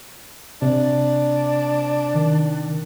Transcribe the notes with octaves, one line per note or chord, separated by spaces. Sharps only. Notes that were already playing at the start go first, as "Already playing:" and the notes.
C3 D4
D#3